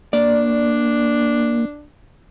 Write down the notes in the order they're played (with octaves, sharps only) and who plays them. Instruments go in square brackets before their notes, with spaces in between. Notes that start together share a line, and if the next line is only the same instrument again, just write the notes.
[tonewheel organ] A#3 [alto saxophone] D4 [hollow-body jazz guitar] D5